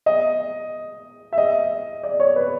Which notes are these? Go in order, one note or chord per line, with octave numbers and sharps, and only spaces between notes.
D#5
E5
D#5
D5
C#5
B4